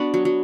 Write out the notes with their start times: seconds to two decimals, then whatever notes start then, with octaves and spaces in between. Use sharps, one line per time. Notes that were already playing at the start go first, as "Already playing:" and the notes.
Already playing: B3 D4 F#4
0.14 F#3
0.25 F#3